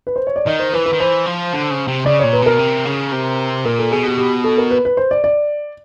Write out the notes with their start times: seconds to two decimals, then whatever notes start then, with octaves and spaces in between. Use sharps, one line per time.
0.07 B4
0.16 C5
0.27 C#5
0.36 D5
0.46 D#3 D#5
0.60 C5
0.73 E3 B4
0.86 B4
0.93 D#3
1.00 E3 C5
1.26 F3
1.53 D3
1.70 C#3
1.88 C3
2.06 C#3 D5
2.20 A#2 C#5
2.33 B4
2.42 B2 A#4
2.59 C3
2.86 C#3
3.13 C3
3.65 A#2 A#4
3.79 A4
3.91 B2 G#4
4.05 G4
4.18 G4
4.44 A4
4.58 A#4
4.71 B4
4.85 B4
4.97 C5
5.11 D5
5.24 D5